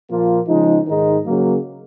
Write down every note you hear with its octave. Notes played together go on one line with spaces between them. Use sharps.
A#2 F3 A#3 F4
C#3 F3 G#3 D#4
G#2 D#3 G#3 D#4
C#3 F#3 A#3